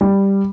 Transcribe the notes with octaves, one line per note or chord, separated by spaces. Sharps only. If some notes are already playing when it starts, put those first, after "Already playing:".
G3